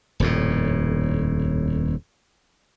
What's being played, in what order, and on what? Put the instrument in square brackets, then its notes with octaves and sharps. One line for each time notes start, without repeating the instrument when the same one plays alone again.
[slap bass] D#1 F2 A2